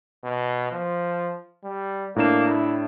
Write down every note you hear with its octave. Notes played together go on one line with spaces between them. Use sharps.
B2
F3
G3
A2 A#3 D4 E7
E4